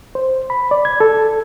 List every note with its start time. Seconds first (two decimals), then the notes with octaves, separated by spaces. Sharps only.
0.15 C5
0.50 B5
0.71 D5
0.85 G#6
1.00 A4